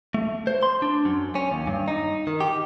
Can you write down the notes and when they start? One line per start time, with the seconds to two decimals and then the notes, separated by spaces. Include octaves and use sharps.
0.14 A3
0.47 C5
0.63 C6
0.82 D4
1.05 F#2
1.35 C#4
1.52 D#2
1.67 G2
1.88 D#4
2.27 D#3
2.40 G4